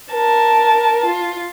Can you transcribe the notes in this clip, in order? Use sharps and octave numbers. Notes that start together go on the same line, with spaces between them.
A#4 A5
F4